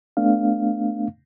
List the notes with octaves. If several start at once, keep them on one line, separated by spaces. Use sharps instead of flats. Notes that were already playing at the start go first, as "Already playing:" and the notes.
A3 B3 D4 F5